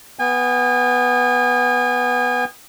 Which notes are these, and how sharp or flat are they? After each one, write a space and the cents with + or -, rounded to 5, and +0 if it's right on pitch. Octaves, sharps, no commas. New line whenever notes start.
B3 +0 G#5 -35